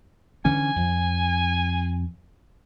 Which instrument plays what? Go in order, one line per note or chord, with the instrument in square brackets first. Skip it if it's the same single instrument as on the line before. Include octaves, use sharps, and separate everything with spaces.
[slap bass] D3 E3 C#4 [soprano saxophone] G#5
[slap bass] F2